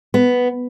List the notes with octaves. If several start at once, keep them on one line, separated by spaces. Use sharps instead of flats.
B3